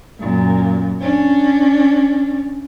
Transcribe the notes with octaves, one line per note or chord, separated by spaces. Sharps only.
F#2 A#2
C#4 D4